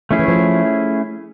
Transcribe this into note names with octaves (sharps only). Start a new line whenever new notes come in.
F3 A3 C#4 E4 G#4
E3
F3